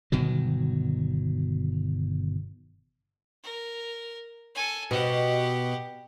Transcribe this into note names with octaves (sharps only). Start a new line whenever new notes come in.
G1 B2 D#3 F#3
A#4
A4 G#5
B2 G4 F#5